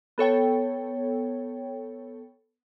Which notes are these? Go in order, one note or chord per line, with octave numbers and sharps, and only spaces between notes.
B3 A4 C#5 G5